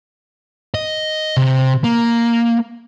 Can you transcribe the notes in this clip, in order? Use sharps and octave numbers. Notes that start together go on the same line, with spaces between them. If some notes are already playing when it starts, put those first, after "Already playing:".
D#5
C3
A#3